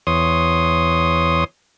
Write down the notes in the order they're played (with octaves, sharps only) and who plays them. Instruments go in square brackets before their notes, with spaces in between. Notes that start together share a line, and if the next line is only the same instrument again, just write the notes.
[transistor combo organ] E2 C#5 C6 D#6